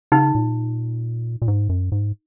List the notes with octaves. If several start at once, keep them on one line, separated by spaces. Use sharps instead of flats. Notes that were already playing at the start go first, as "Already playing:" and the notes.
C#3 D#4
A#2
A#2
G#2
F#2
G#2